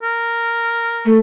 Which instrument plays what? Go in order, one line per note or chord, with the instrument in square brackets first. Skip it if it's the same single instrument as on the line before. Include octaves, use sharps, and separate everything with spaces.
[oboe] A#4
[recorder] A3